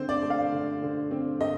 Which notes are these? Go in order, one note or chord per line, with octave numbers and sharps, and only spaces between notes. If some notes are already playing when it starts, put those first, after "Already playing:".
Already playing: D3 C4 C5
D5
A3
F5
D3
D3
C4
A3 D#5